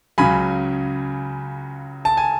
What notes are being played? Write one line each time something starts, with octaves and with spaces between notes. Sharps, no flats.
C#2 C#3 F#3 G#5 B5
A5
G#5